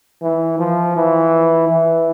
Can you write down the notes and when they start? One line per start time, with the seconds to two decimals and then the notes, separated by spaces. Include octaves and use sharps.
0.22 E3
0.59 F3
0.96 E3
1.69 E3